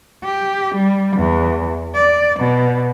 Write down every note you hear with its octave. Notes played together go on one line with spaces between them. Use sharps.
G4
G3
E2
D5
B2